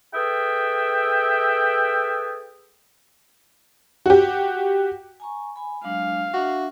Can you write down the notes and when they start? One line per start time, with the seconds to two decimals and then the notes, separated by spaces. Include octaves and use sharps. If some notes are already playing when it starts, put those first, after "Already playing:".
0.15 G#4 A4 B4 E5 G5
4.06 F#4 G4
5.20 G#5 A#5 C#6
5.56 G#5 B5
5.84 F#3 G#3 D4 F5
6.34 D4 F#4 E5